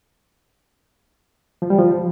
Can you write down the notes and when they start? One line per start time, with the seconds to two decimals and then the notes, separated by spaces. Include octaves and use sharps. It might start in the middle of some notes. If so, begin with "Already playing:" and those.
1.62 F3
1.70 G3
1.79 F3